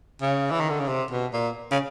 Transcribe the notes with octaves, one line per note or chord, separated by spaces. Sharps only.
C#3
E3
D#3
D3
C#3
C3
B2
A#2
C#3